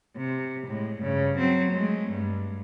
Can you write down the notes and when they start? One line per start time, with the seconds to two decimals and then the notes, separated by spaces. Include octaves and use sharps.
0.17 C3
0.67 A2 G#3
0.99 G2 C#3
1.38 F#3 C4
1.71 G#3 A3
2.11 G2